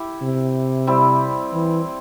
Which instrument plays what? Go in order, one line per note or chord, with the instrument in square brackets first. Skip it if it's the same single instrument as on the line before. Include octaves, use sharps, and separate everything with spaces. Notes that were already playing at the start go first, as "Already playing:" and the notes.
Already playing: [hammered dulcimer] E4 G4
[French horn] C3
[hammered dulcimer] G3 C4 E4
[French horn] E3